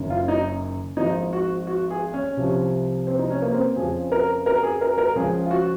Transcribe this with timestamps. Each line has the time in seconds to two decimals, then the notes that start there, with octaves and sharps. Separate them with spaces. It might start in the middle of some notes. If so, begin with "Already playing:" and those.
Already playing: F#1 F#2 D#3
0.10 F4
0.28 D#4
0.97 G#1 G#2 F3 D#4
1.33 F#4
1.67 F#4
1.90 G#4
2.14 C#4
2.37 C2 C3 F3
3.07 C4
3.19 D#4
3.30 C#4
3.42 A#3
3.53 C4
3.76 F2 C#3 F3 G#4
4.12 A#4
4.46 A#4
4.63 G#4
4.81 A#4
4.98 A#4
5.15 C#2 C#3 F3 G#4
5.46 F4
5.51 F#4